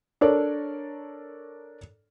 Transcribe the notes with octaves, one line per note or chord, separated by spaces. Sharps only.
D4 A4 A#4 C#5 D5